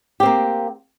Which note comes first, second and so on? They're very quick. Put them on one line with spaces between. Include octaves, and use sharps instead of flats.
G4 C4 A#3